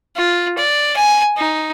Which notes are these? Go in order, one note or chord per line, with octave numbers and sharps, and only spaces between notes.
F4
D5
G#5
D#4